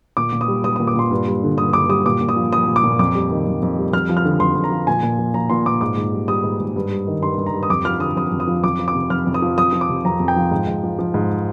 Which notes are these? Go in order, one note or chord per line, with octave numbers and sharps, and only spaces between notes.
A#2 D6
A#2
D#6
G3
G3 D#6
A#2 D#6
D6
A#2 C6
G2
G3
D3
G2 D#6
G2 D6
G3 D#6
A#2 D6
A#2
D#6
F3
F3 D#6
A#2
D6
A#2
F2 D6
G3
D#3
F2
F2
G3
F2 F6
F3
F6
D3
F2 C6
F2
A#5
F3
A#2 G#5
A#2
F3
F3 A#5
A#2 C6
A#2 D6
G#2 D6
G#2
G3
G3 D#6
G#2
G#2
G2
G3
D#3
G2 C6
G2
A#5
G3
D#6
F2 D6
F3 F6
D3 D#6
F2 D#6
F2
D#6
F3
F2 D6
F3
D6
C3
F2 F6
F2
D#6
F3
F2 D#6
F3
D6
C3
F2 A#5
F2
G5
F3
G#2
G#2
F3
F3
G#2